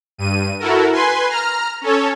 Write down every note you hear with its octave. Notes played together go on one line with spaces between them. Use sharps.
G2 D#7
E4 F#4 A4 A#4
B4 G#5 C6
A#5 F6
C#4 A4 C#5